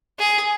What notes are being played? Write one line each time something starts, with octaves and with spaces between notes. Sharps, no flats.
G#4